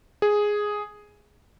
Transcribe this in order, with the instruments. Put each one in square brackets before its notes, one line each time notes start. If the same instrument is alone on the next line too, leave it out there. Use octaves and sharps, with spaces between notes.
[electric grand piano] G#4